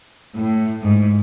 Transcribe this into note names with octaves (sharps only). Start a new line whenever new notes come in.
A2
G#2